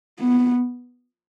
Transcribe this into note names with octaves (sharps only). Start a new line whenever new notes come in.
B3